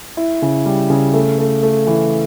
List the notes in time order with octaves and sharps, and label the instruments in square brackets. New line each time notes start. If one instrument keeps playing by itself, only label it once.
[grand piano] E4
C#3
G3
C#3
A3
A3
A3
E3